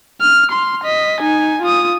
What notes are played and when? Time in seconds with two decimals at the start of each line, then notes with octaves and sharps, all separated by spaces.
0.21 F6
0.51 C6
0.84 D#5 B6
1.20 D#4 G#5
1.62 F4 D#6